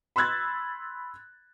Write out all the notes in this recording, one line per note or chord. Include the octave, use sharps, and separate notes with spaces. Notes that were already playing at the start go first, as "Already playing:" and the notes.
B5 C6 E6 F#6 G#6 A6